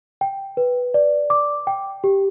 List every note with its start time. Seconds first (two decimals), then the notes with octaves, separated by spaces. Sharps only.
0.21 G5
0.57 B4
0.94 D5
1.30 D6
1.67 G5
2.04 G4